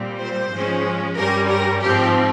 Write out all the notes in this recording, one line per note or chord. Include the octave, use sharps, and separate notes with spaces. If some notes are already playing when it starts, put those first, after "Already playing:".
Already playing: A#2 G3 C4
C5
G#2 F3 G#3 C#4
G2 G3 C#4 A#4
A#4
G#2 F3 C4 G4